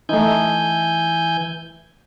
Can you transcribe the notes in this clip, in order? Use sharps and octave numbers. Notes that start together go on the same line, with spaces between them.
E3 A3 D#4 G#5 G6